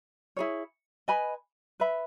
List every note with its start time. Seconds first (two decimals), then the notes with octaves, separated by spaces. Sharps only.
0.36 E4 G#4 C#5
1.08 B4 D#5 G#5 B5
1.80 B4 E5 B5